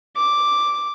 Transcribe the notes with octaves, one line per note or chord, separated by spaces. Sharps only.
D6